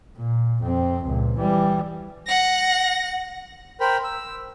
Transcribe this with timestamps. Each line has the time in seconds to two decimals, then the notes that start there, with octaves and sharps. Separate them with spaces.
0.17 A#2
0.62 F2 C4
1.05 C#2 A#2
1.36 E3 G3
2.27 F#5 A#6
3.80 A#4 C5 G5 B5
4.04 E6